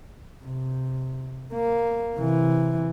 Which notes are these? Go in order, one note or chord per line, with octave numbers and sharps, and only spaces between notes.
C3
A#3
C3 E3